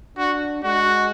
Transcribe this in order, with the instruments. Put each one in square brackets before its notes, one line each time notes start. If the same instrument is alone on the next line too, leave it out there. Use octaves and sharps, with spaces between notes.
[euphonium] D4 [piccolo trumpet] F#4
[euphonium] G#3 [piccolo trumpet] F#4